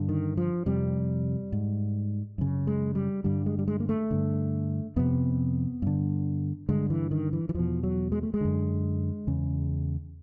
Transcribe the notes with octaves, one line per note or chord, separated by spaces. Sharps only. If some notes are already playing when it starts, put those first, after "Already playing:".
Already playing: G2 D3
D#3
F3
F2 C3 G3
G#2
F#2 C#3
G#3
G3
G2 D3 G3
G#3
G3
G#3
A#3
A3
G2 D3
F2 C3 B3
G2 D3
G2 D3 G#3
E3
D#3
E3
E3
E2 B2 F3
F#3
G#3
A3
G#3
F#2 D3
E2 C#3